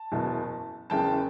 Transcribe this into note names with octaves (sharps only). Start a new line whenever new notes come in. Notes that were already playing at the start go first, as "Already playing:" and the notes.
Already playing: A5
F#1 E2 B2
F#1 E2 C#3 G5 A5